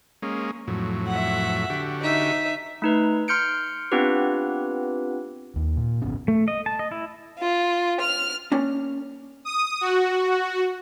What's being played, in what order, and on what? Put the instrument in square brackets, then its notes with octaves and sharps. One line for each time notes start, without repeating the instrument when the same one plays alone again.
[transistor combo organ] G#3 A#3 C#4
F2 A2 F#3
[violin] E5 F#5
[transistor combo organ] D3 F#4 G4
[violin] D#4 E5
[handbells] A3 D#4 B4
C6 F6 G6 C#7 D7
B3 C4 D4 F4 G4 B4
[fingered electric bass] D#2
A#2
G#1 B2 C#4
[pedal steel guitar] A3
D#5
A5
D#5
E4
[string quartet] F4
F6
[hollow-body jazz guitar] A#3 C#4 D4
[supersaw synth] D#6
F#4